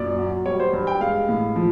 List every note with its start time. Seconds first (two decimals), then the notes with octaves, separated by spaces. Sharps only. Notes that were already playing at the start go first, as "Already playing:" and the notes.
Already playing: F#2 A#2 D5
0.18 F#3
0.46 G3 C#5
0.60 C5
0.73 G2
0.87 G5
1.01 G#3 F5
1.29 A2
1.56 F3